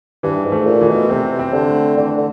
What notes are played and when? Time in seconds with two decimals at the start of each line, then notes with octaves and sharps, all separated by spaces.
0.23 G2 E3
0.45 G#2
0.52 A3
0.66 A#2
0.81 E3
0.88 B2
1.10 C3 C4
1.39 C4
1.53 D3
1.68 A3
1.97 D3 E3
2.17 D3